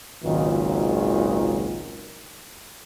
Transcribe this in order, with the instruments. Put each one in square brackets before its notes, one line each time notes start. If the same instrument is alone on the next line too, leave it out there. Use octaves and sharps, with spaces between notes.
[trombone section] G#1 C#2 A#2 D#3 F#3